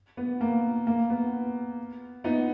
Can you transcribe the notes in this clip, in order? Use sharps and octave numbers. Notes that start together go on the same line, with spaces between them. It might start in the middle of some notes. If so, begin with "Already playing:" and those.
B3
A#3
A#3
B3
B3 D#4